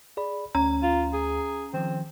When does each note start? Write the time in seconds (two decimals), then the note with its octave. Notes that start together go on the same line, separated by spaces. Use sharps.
0.17 G#4 D5 B5
0.55 D2 C#4 A#5
0.83 F4
1.14 G#4
1.74 D#3 F3 C4